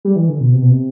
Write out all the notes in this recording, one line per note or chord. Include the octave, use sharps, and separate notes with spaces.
G3
E3
D3
B2
C3
B2
C3